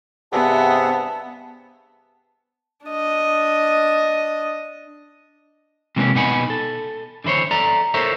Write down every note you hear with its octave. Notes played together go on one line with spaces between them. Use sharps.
G2 C3 B3 G#4 E5 F#5 A5
D4 D#5
C3 E3 G#3 A#3 C4 C#4
B2 B3 D#4 F#5 G#5 B5
A4
D3 E3 E4 C5 C#5
A4 D5 E5 A#5
A4 A#4 C5 C#5 E5